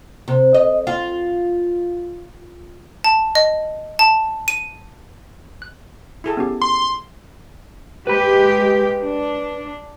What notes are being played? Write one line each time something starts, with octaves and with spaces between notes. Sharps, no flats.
C3
D#5
F4
A5
D#5
A5
D#7
F#6
E4 G#4 A4
B3 C#4 G4
C6
G#3 G4 B4 B5
D4